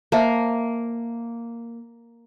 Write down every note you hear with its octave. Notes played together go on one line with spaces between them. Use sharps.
A#3 C5 E5 A5